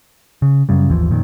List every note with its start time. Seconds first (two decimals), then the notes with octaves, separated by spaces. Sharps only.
0.42 C#3
0.69 F#2 C#3 G3
0.88 G#1 D#2 E3 F3
1.10 F2 A#2 D#3